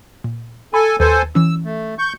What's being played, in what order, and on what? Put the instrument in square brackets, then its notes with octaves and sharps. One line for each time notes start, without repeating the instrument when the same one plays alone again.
[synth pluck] A#2
[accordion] A4 G#5 [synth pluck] B5
[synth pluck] D#2 B4 [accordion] A4 C5 G#5
[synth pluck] E3 C#4 [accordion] E6
[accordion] A3
C#6 G6